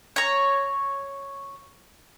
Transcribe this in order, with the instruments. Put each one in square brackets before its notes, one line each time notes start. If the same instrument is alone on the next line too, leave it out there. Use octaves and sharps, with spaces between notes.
[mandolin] C#5 A#5